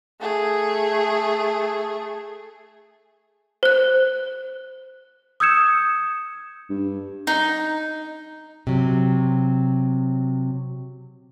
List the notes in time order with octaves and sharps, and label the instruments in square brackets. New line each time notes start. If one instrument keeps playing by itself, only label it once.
[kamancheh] A3 G#4
[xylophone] C5 F#6
[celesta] D#6 E6 G6 G#6 C#7 E7
[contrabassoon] G2
[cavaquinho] D#4
[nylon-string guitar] C3 F#3